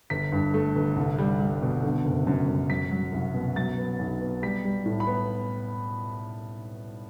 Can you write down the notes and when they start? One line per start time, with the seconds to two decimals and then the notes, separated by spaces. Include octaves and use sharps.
0.10 G1 B6
0.32 G2
0.54 A3
0.76 G1
0.96 C2
1.18 G3
1.40 G3
1.62 B2
1.83 D3
2.05 F#1
2.27 F#2
2.48 F#2
2.70 F#3 B6
2.91 F#3
3.13 C2
3.34 B2
3.56 F#3 A6
3.78 B3
3.99 B1
4.21 B3
4.43 G3 B6
4.64 G3
4.86 A2
5.00 B5
5.07 B3